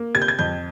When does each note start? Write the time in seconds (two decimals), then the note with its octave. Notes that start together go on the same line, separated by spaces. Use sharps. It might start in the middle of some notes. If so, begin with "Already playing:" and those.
Already playing: A#3
0.15 C3 G#6
0.22 G6
0.28 G#6
0.39 F2 G6